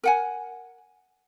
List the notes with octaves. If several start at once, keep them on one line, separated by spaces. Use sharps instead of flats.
A#4 F#5 G#5